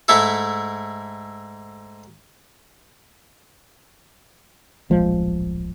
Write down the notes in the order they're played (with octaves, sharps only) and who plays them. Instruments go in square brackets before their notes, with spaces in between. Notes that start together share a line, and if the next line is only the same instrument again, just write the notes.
[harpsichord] G#2 A3 E4 A4
[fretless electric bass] D1 A#1 F3 G#3